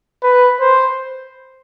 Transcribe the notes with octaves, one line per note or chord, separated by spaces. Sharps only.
B4
C5